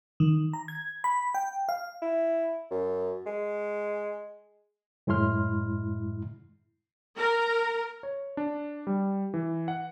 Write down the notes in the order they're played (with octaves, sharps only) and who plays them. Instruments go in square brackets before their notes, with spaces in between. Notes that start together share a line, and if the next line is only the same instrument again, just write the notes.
[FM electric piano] D#3
A#5
G#6
B5
G5
F5
[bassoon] E4
F#2
G#3
[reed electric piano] F#2 A2 G#3 E4 C6 F6
[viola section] A#4
[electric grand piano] C#5
D4
G3
E3
F#5